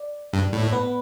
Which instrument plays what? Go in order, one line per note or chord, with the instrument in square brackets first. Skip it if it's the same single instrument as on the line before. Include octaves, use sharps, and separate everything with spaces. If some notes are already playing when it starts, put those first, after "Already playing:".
Already playing: [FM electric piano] D5
[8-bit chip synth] G2
A2
[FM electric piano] B3 B4